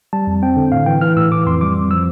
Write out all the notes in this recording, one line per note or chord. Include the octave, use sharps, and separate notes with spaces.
G3 A5
F2
C4 G5
D3
A2 F5
E3 G5
E3 F6
A2 E6
E3 D6
F2 C6
G3 D6
F2
F3 E6